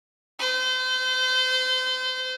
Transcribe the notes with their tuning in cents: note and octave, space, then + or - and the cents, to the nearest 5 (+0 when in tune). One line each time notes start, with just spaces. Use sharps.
C5 -35